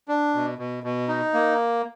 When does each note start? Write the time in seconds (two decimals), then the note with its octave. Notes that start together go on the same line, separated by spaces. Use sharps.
0.08 D4
0.34 B2
0.58 B2
0.84 B2
1.08 D#4
1.34 A#3